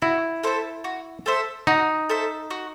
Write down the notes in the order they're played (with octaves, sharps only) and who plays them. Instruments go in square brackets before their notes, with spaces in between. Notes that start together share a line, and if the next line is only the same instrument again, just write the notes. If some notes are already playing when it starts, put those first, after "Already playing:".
[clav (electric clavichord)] E4 [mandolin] F#4
[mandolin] A4 C5 E5
F#4
A4 C5 E5
[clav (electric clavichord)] D#4 [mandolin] F#4
[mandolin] A4 C5 E5
F#4